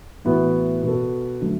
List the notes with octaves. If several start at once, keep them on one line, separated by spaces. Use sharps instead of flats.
A2 E3 B3 F#4
B2 B3 F#4 A4
D3 F#3 A3